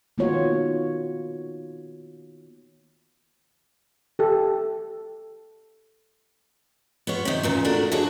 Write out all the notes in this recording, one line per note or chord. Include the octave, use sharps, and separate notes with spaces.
D#3 A#3 B3 F4 F#4 C#5
G4 A4
B3 F4 C#5
C3 D#3
E2 A#2 C#3
A3 D4 F4 F#4 A#4
D4 E4 F#4 G#4 C#5